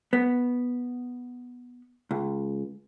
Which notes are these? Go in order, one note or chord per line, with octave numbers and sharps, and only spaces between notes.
B3
C#2